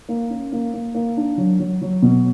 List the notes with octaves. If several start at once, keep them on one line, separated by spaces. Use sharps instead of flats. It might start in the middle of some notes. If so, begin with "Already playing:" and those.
A#3
C#4
A#3
A#3
A#3
D4
F#3
F#3
F#3
B2